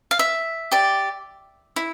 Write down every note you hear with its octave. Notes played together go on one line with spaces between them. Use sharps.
F5
E5
G4 D5
E4